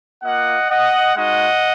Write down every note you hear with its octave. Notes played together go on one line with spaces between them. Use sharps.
A#3 F4 D#5 F#5
D#5 F#5
G#3 D#4 F#4 D#5 F#5